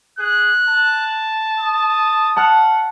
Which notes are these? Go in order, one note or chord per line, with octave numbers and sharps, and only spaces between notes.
G#4 F#6
A5
D#6
F#5 A5 F6 F#6